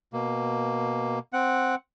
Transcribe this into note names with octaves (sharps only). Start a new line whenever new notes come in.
B2 A#3
C4 F#5